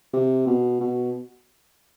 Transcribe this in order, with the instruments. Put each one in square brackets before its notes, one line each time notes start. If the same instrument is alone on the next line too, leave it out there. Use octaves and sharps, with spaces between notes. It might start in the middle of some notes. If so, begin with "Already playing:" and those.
[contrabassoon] C3
B2
B2